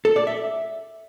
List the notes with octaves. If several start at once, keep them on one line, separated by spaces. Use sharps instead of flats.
A4
D5
E5